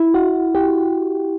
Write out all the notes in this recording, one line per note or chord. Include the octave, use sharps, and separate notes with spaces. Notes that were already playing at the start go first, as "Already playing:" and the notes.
Already playing: E4
F#4
G4